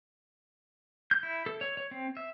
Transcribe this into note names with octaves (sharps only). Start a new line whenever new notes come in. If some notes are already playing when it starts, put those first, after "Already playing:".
G6
E4
A4
C#5
C#5
C4
E5